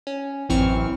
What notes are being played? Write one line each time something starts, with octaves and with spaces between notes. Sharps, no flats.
C#4
A1 F#2 E3 C4 C#6 F6